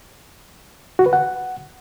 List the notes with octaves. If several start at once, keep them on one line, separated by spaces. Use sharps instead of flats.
F#4
B4
F#5